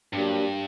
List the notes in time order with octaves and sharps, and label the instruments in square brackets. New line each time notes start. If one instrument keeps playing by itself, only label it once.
[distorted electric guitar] G2 [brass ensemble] F#3 A#3 D4 G4